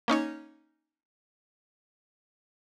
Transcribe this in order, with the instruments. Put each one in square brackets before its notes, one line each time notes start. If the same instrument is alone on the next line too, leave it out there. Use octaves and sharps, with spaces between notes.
[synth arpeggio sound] A#3 C#4 D#4 C#5